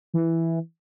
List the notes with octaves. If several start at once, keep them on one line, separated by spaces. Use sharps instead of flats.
E3